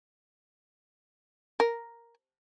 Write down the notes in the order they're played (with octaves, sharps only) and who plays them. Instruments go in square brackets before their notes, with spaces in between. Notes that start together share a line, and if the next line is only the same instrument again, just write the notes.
[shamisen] A#4